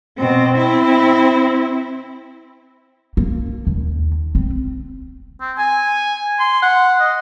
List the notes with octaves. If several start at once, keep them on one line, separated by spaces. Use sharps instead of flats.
B2 C4
C4 E4
A#3
D#2
C4
C4
G#5
C6
F#5
D#5